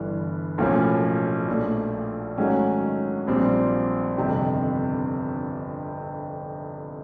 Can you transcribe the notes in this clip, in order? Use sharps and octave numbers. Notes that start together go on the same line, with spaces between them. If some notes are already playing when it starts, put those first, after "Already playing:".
Already playing: G1 G2 E3
B1 A2 F3 A#3 C#4
A#1 A#2 F3 A3
G#2 D#3 F#3 A3 C#4
A#1 A#2 G3 C4
G1 F2 C3 D#3